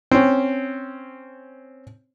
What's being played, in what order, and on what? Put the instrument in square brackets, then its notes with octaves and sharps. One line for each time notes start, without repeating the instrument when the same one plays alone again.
[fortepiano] C4 C#4